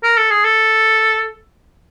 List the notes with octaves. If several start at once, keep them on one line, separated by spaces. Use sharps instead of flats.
A#4
A4
G#4
A4